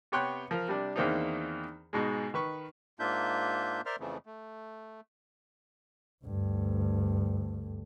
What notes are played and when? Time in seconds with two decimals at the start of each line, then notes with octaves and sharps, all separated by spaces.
0.12 C3 B3 C#5 G5 C6 F#6
0.51 F3 A#4
0.68 C3 G3 D4
0.96 E2 D#3 A#3 C4 D4 D#4
1.93 G#2 B2 G#3
2.34 D#3 B4 C#6
3.00 G#2 A#3 D4 F4 E5 G6
3.86 A#4 C5 D5 E5 C6 F6
4.00 F2 C#3 E3 F3 A3
4.26 A3
6.24 D2 G2